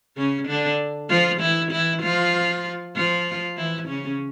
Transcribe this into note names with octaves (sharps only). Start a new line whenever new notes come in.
C#3 C#4
D3 D4
F3 F4
E3 E4
E3 E4
F3 F4
F3 F4
E3 E4
C#3 C#4